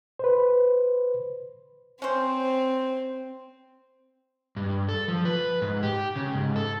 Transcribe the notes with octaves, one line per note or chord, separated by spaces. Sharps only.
B4 C5
C4 C#4 C5
G2
A4
F3
B4
G#2
G4
C#3
G#2
A4